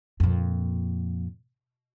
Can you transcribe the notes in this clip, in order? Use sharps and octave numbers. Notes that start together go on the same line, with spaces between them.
F2 A#2